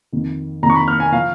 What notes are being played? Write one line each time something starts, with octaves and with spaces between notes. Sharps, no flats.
F2 D#3
F2 D#3 A#5
C#6
B5
F6
G#5
F3 F5